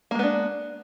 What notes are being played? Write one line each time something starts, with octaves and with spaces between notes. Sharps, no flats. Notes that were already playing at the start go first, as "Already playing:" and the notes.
G#3 A#3 B3 D4